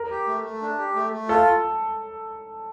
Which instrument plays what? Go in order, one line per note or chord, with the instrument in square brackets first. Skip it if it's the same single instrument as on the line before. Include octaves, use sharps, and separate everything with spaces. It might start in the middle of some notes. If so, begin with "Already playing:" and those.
Already playing: [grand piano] A#4
[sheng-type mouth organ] G4
A3
A3
D4
G4
A3
A3
[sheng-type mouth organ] F4 [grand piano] A4